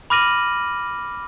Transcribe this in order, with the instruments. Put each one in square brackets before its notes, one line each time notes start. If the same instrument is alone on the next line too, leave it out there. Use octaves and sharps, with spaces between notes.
[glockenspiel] B5 D6 F6 A#6 D#7 F#7